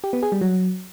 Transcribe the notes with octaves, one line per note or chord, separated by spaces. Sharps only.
G4
B3
G#4
G3
F#3